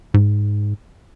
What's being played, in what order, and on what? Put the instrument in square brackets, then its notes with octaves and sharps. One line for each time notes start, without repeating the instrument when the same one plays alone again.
[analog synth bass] G#2